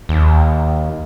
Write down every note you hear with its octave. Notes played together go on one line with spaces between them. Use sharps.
D#2